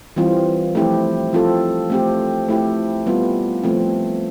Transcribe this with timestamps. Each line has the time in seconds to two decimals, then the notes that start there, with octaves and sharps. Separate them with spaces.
0.16 E3 G3 C4 F4
0.75 F3 A3 C4 E4 G4
1.33 F3 C4 F4 A4
1.90 A3 C4 G4
2.48 A3 E4 G4
3.06 G3 B3 F4
3.64 F3 A3 C4